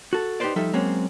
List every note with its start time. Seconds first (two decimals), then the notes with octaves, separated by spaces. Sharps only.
0.13 F#4 A4
0.40 D#4 G4 A4 B4 C5 D5
0.56 F3 G3 D#4 A4 E5
0.73 F#3 G#3 A#3 C4 C#4